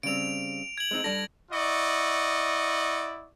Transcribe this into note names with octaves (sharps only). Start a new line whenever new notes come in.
C#3 G3 C4 D7 F7
G#6 F#7
G#3 C4 D#4
G3 D4 A4 A#6
E4 D5 D#5 F#5 C#6